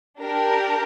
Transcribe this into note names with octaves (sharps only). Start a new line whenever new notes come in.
D4 G4 A#4